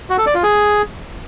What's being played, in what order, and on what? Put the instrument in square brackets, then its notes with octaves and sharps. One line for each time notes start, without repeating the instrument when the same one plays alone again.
[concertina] F#4
A4
D5
F4
G#4